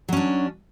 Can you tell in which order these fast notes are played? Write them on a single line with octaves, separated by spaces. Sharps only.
F#3 C#4 D4